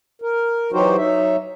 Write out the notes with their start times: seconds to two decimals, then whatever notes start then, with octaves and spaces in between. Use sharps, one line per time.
0.22 A#4
0.72 E3 F#3 D#4 F#4 G4 C5
0.97 F#3 D#4 E5